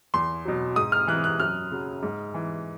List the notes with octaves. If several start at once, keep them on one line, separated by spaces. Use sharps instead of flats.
E2 C6
B2 F#3
G#2 D#6
F6
E3 F#6
F#6
F#2 F6
C#3 F#3
G#2
E3